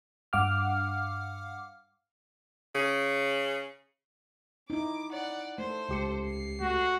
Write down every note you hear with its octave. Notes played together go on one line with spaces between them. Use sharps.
G2 F5 F#5 D6 F6
C#3
D#4 E4 D6
D5 F#5
A3 A4 C5
C#2 G4 C#7
C7
A3 F#4